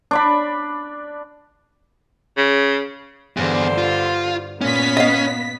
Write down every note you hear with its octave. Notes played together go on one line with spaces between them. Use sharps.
D4 D5 B5
C#3
E2 G2 D3 C5
F4
A#2 B3 C#4 B6
D#5 F5